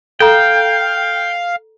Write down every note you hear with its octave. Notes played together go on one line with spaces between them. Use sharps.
A4 F5 G5 A#5